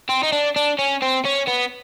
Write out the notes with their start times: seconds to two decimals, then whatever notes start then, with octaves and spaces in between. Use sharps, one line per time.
0.09 C4
0.23 D#4
0.32 D4
0.56 D4
0.79 C#4
1.02 C4
1.25 C#4
1.48 B3